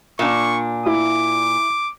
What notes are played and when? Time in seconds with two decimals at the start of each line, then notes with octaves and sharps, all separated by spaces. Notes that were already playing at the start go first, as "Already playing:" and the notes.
0.19 A#2 D4 C#6
0.86 E4 D6